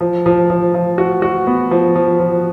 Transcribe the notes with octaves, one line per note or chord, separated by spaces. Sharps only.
F3
F3
F3
F3
F#4
F#4
B3
F3
F3
F3